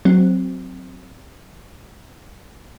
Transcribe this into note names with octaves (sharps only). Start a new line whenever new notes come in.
F#3 C4